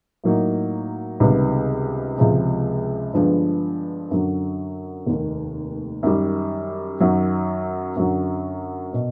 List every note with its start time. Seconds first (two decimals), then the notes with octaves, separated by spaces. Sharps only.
0.24 A2 F#3 A#3 D#4
1.20 C#2 C3 D#3 G3 B3
2.17 C#2 C3 F3 G#3
3.14 G2 D3 F3 G#3 B3
4.11 F#2 D3 F#3
5.07 F1 D#2 D#3
6.03 F#2 D#3 G3
7.00 F#2 D#3 F#3
7.96 F#2 D3 F#3
8.93 B2